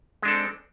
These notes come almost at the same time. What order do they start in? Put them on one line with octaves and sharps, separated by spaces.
G#3 D4 A4 C4